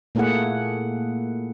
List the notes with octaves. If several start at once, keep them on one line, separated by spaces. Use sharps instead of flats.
A#2 A3 A#3 E4 G#4 F#5